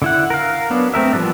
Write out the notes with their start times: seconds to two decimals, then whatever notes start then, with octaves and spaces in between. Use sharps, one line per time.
0.02 D3 E4 F#5
0.30 A#4 F5
0.70 F#3 B3 D4
0.94 A3 C4 A#4 E5
1.13 E3 F3 G3 B3 D4